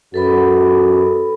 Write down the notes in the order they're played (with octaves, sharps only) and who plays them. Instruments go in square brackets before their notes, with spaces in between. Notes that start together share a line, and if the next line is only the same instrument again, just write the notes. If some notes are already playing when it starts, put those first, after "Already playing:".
[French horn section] F#2 F#4 [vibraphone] A4 B4 B5